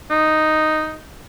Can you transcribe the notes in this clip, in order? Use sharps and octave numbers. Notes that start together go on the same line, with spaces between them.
D#4